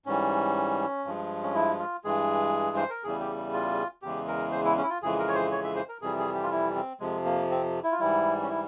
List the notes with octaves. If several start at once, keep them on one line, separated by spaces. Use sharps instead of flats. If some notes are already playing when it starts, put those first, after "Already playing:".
G#2 E3 G3 C#4
G2 F3 G#3
C#4
E4
F4
G2 E3 G#3 G#4
C5
A#4
E2 C#3 E3 G3 G#4
G4
F4
E2 C#3 E3 G#3 G4
A#4
C5
E4
C#4
E4
F4
F2 C#3 E3 G#3 G#4
A#4
C#5
C5
C#5
E5
C5
A#4
F2 C3 E3 G3 G#4
G#4
G4
F4
E4
C4
F2 C3 F3 G#3
A#3
C4
E4
F4
G#2 E3 G3 E4
C#4
E4